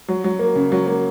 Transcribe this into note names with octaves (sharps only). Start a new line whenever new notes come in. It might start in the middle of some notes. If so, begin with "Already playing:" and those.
F#3
F#3
A#3
C#3
F#3
A#3